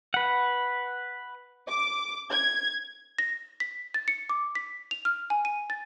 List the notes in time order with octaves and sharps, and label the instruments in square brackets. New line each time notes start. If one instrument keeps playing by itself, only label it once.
[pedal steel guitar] B4 F#5
[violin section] D6
G#6
[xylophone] A#6
B6
A6
C#7
D6
B6
F7
F6
G#5
D#7
A6